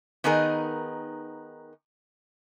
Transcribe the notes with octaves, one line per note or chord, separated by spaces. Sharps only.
D#3 B3 D#4 G#4 A#4